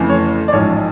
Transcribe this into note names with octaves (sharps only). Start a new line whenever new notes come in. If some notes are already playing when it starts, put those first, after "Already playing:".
Already playing: F2 C#3 E3 A3
C#5
D5
A1 G#2 F3 G#3 C#5